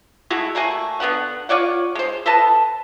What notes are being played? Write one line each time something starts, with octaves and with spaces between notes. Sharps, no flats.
G#3 A3 E4 F#4
A3 A#3 F#4 G#5
D3 B3 E4 F#5
F4 C#5 D5 F#5
G#3 C5
A4 B4 D#5 A5